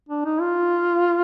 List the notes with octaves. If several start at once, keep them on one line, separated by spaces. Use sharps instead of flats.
D4
D#4
F4